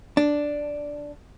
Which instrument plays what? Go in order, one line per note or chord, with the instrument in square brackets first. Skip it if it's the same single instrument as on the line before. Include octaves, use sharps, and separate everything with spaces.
[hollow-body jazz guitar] D4